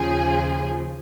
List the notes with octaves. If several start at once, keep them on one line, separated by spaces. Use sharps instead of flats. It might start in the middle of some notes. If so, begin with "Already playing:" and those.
Already playing: D#2 C#3 F3 G#4